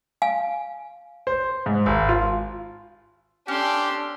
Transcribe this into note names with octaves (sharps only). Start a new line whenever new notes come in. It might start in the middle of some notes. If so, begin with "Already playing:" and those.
F5 G#5
C5
G#2
G#1
F4
C#4 D4 G4 A4 C6